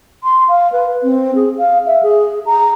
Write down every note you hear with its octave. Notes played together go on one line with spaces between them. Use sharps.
C6
F5
B4
C4
G#4
F5
E5
G#4
A#5